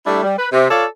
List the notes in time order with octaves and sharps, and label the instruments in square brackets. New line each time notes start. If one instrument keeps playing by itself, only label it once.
[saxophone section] G3 A3 D4 E4
G3
B4
C3
F4 A4 C#5 D5